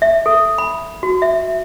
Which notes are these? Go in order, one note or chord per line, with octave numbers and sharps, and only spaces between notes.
E5
A4
B5
F#4
E5